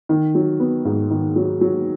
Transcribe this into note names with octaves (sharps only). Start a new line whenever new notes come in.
D#3
F#3
B3
G#2
D#3
F#3
F#3